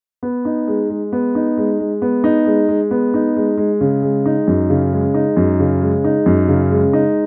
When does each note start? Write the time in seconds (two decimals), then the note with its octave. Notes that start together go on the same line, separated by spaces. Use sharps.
0.23 B3
0.45 D#4
0.68 G#3
0.90 G#3
1.12 B3
1.35 D#4
1.57 G#3
1.79 G#3
2.02 B3
2.24 D#4
2.46 G#3
2.68 G#3
2.91 B3
3.14 D#4
3.36 G#3
3.57 G#3
3.81 C#3
4.03 G#3
4.26 D#4
4.48 F#2
4.70 C#3
4.92 G#3
5.14 D#4
5.37 F#2
5.60 C#3
5.81 G#3
6.04 D#4
6.26 F#2
6.48 C#3
6.71 G#3
6.93 D#4